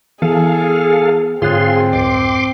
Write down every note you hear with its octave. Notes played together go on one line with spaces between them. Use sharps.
E3 B3 G#4 A4 F5
G#2 D3 C4 F4 G#4 C#5 C6 F#6
C2 F2 C6 D6